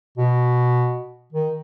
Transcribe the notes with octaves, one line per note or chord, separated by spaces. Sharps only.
B2
D#3